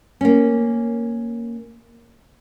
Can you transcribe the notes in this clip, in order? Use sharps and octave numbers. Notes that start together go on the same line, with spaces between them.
A#3 C#4